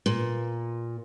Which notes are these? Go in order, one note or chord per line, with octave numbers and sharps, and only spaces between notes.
A#2